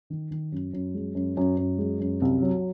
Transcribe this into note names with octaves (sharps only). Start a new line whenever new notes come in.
D#3
D#3
F#2
F#2
G#3
F#2
F#2
F#2
G#3
F#2
C2
F#3